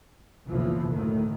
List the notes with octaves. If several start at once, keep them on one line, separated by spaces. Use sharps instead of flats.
F#1 B1 E3 F3
D2 A2 D#3